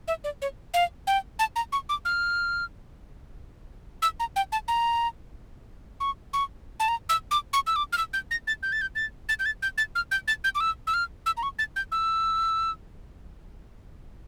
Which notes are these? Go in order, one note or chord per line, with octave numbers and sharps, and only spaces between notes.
E5
D5
C#5
F5
G5
A5
A#5
C#6
D6
F6
E6
A#5
G5
A5
A#5
C#6
C#6
A5
A#5
E6
D6
C#6
E6
D6
F6
E6
G6
A#6
A6
G6
A6
G6
A6
A6
G6
A6
G6
A6
F6
G6
A6
G6
D6
E6
E6
F6
E6
A#5
C#6
A6
G6
E6